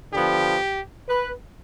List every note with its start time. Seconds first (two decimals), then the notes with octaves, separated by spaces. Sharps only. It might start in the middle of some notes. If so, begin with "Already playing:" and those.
0.13 D3 F3 B3 G4
1.07 B4